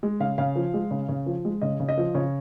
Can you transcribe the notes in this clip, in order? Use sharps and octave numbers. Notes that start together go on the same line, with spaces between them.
G#3
C#3 F5
C#3 F5
F3
G#3
C#3
C#3
F3
G#3
C#3 D#5
C#3
D#5
F3
C#3 C#5